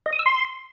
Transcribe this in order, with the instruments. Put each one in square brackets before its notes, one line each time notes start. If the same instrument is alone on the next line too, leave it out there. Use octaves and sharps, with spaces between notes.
[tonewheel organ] D#5
D#6
E6
C6